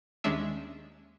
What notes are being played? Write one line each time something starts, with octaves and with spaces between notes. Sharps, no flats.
D#2 D#3 G#3 C#4 D4 E5